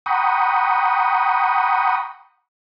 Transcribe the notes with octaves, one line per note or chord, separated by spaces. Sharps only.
F#5 G5 A#5 B5 C#6 D#6